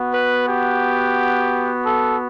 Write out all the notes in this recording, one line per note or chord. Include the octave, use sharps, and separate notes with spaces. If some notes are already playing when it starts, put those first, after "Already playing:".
Already playing: B3 F#4
B4
G4
A4